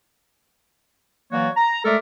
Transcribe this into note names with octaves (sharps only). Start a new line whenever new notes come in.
E3 F#3 A#3 F#4 C#5 D5
A#5
G#3 A3 A4 A#4 D5 E5